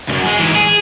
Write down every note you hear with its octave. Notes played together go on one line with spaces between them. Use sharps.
C#2 F#2
G#3
G#2 E3
G#4